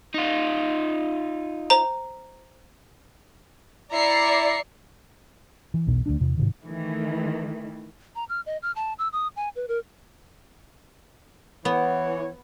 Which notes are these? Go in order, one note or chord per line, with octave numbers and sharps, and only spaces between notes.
D#4 F4
C5 A#5
E4 D5 E5 A#5 C7 C#7
E3
B1 E2 B2
D2 F3 D4
E2 C3
G#2 C3 D#3
D#3 E3 A3
A#5
F6
D#5
F6
A5
E6
D#6
G#5
B4
A#4
E3 B3 C#5